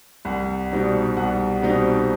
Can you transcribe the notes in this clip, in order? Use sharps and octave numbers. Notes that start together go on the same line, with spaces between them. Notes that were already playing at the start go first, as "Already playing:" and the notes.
C2 F#5
B2 G3 C4 D#4
C2 F#5
B2 G3 C4 D#4